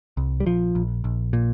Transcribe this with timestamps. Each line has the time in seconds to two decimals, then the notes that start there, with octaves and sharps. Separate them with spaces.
0.17 C2
0.40 G3
0.46 A#1 F3
0.75 A#1
1.04 A#1
1.33 A#2